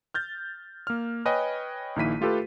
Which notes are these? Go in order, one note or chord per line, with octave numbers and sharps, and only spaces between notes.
F6 G6 A6
A#3 F6
B4 C#5 D#5 G5 G#5
A#1 D#3 A#3 E4 B6 D#7
A3 F4 G4 A4 B4